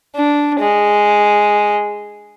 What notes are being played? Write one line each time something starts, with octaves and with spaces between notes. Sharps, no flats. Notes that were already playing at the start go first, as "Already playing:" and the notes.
D4
G#3